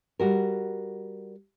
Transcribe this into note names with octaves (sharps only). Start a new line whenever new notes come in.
G3 F#4 A#4